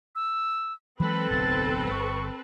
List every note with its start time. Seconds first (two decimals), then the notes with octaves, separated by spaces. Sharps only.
0.15 E6
1.00 E3 F#3 G#3 C4 A4 B4 B5
1.30 D1 B1 C3 A6
1.91 G1 C#6